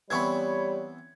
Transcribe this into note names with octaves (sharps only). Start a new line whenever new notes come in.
E3 G3 B3 C4 C#5 B5 C#6 G#6